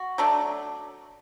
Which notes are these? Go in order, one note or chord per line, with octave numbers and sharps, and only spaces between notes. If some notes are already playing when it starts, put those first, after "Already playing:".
Already playing: F#4
F#3 A3 D4